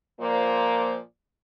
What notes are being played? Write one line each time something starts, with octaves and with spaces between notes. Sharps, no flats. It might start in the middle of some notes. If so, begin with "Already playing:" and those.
A#2 F3 A#3 C5 D5